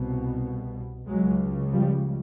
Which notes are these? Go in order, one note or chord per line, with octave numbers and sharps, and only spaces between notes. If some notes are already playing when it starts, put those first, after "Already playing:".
Already playing: C2 B2
C#2 C#3 F#3 G#3
F3 G3